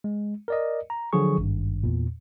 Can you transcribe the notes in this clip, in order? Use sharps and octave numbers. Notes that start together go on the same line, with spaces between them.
G#3
A#4 D5 D#5
A#5
D3 F3 F#3 G#4 C#6
G#1 G2
E2 A#2